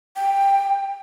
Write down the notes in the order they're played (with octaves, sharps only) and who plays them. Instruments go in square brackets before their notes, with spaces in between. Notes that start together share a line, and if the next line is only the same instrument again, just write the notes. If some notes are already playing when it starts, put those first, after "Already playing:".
[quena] G5